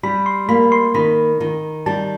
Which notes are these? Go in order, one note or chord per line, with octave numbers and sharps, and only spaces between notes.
G3 B5
C6
A#3 B5
C6
D#3 B5
D#3
G3 A5